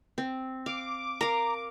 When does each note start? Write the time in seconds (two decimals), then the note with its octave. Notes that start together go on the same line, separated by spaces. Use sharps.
0.18 C4
0.66 F5 D6
1.21 A#4 F5 A#5